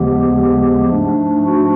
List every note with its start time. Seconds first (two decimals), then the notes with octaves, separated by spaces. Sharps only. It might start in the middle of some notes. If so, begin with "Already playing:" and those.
Already playing: D#2 C#3 F3 G#3 B3 G4
0.34 G4
0.89 G#2 F3 A3 D4
1.45 F#4